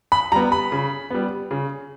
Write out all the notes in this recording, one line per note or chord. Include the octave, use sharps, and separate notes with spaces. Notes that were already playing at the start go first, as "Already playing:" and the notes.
B5
G3 B3 A#5
B5
C#3
G3 B3
C#3